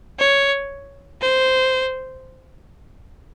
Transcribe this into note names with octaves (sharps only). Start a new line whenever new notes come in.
C#5
C5